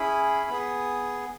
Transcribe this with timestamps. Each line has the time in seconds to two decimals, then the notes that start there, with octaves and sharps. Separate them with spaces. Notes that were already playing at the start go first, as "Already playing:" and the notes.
Already playing: C#4 E4 G#4 B5
0.50 B3 G#4